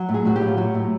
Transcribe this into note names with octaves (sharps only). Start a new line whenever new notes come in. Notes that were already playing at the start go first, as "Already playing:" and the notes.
Already playing: F#3
A2
G#4
A2 F#4
G4
F#3
F4
F#3 F#4
A2